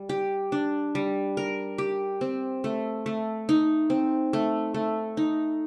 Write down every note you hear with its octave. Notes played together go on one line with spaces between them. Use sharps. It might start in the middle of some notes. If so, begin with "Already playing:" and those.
Already playing: G3
G4
D4
G3
A#4
G4
C4
A3
A3
D#4
C4
A3
A3
D#4